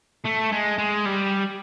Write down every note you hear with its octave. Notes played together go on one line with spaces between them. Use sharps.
A3
G#3
G#3
G3